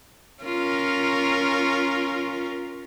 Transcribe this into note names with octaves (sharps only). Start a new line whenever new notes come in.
C#4 F4 A#4